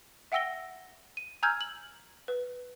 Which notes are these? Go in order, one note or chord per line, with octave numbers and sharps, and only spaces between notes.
E5 F#5 G5 E6 A#6 G7
D#7
G#5 A#5 E6 F6 G6 G#6
F#7
B4